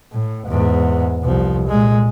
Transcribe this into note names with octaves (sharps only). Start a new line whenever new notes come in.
A2
E2 G#2
C2 F3
A#2 G#3